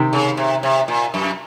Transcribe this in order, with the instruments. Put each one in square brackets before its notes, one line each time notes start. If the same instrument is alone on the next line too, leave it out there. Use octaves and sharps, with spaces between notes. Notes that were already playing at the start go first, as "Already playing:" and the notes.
Already playing: [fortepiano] C3 D#3
[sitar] C#3
C3
C3
A#2
F#2